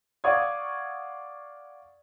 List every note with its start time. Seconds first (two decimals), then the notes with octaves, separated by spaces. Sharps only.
0.24 D5 F5 F#5 C#6 D#6 G#6